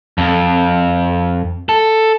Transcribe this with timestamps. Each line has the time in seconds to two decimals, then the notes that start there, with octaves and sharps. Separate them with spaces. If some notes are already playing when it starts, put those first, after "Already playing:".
0.18 F2
1.69 A4